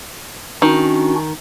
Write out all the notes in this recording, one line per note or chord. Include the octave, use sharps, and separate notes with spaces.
D#3 C#4 D4 F#4